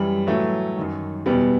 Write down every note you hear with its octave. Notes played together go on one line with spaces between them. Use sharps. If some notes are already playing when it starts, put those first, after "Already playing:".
Already playing: F#2 E3 G3
A2 E3 F#3 A3
F#2 D#3
E2 B2 G3 B3